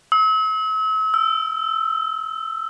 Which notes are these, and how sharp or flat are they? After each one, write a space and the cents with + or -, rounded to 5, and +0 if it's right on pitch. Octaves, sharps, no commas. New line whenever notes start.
E6 -40
E6 +15